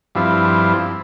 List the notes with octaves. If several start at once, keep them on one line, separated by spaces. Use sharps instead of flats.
G2 F3 C4 E4